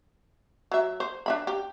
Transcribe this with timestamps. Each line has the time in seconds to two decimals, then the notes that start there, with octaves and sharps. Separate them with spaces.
0.72 F#3 E5
1.00 C5
1.26 D4 E5 B5
1.47 G4